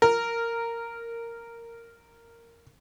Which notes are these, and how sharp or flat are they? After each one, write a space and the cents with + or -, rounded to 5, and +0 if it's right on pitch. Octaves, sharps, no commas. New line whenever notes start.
A#4 -10